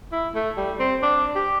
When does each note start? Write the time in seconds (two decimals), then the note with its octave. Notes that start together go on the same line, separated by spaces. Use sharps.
0.12 E4
0.35 A3
0.57 G3
0.79 C4
1.02 D4
1.35 G4